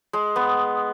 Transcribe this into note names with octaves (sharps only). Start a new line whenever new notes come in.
G#3
B3